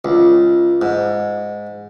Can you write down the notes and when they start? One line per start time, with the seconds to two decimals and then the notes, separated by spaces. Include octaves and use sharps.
0.05 C#2
0.82 G#2